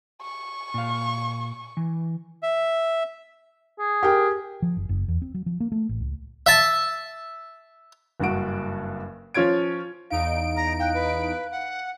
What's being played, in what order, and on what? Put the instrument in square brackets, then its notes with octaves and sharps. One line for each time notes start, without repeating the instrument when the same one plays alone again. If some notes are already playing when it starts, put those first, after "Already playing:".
[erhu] C#6
[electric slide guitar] A#2 F5
E3
[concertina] E5
[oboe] G#4
[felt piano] G4 A#4 G5
[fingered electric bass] F3
F#1
F#1
E2
C4
F#3
F3
A#3
A3
A1
C#2
[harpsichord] E5 A5
[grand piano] F#1 G2 F#4 D7
F3 C#4 F4 C#5 G#6 D7
[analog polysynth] E2 D#4 D7 [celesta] F5
[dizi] A#5
[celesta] F5 F#6 [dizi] G5
[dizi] B4
F#5